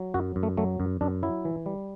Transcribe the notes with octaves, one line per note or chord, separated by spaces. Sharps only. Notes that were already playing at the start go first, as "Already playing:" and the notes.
Already playing: F#3
F#2 F#4
F#2
A3
F#3 A3
F#2
F#2 D4
F#3 E4
E3
G3